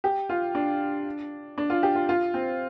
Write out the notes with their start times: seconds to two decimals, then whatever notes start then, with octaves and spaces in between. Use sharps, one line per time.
0.04 G4
0.29 F4
0.55 D4
1.58 D4
1.70 F4
1.83 G4
1.95 F4
2.09 F4
2.34 C4